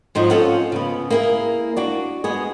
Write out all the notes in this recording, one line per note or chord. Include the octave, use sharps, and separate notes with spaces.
G#2 F3 F#3 D#4
C#4 F4 A4 F5 F#5
C#3 B3
A#3 E4 G#4
D4 F#4 D5
G#3 B3 G#4